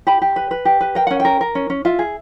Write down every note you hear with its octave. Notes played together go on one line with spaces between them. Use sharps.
G4 B5
G4
B4
B4
G4
B4
A#4 G5
C#4 F#5
A#4 G5
A#4
C#4
C#4
F4 E5
G#4